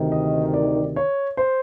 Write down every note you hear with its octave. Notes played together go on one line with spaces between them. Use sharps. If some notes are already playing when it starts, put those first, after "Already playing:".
Already playing: D2 C3 D#3
D#5
D5
C#5
C5